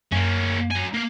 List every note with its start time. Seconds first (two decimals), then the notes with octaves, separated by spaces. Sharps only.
0.12 F#2 A#3 C#4
0.71 F#3 G#5
0.94 A#3 F5